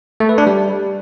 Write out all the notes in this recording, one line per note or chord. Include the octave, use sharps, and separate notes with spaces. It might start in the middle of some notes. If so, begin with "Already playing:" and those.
A3
B4
D4
G3